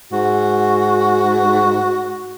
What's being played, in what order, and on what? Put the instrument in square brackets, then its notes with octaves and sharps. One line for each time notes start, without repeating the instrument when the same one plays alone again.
[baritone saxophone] G#2 [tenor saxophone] F#4